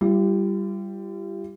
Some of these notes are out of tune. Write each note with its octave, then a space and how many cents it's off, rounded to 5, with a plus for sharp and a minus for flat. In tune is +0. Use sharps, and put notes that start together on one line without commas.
G3 +0 F4 -45